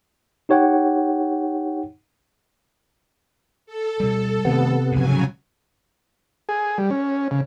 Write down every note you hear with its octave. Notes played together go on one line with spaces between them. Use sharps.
D#4 G4 C#5 F#5 G5
A4
B2 G3
C3 D#3 A3 B3
F1 G#2 C#3 F#3 G#5
G#4
G3
C#4
C#3